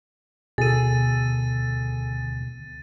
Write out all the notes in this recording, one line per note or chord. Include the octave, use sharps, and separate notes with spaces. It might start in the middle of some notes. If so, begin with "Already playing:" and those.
D2 B2 G#4 A4 A6 D#7